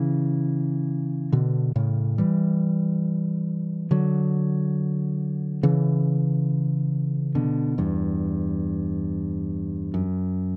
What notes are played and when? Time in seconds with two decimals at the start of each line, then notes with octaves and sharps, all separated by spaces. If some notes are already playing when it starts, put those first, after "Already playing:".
Already playing: C#3 E3
1.32 B2 D3
1.76 A2 C#3
2.18 E3 G3
3.91 D3 F#3
5.63 C#3 E3
7.35 B2 D3
7.78 E2 G2
9.94 F#2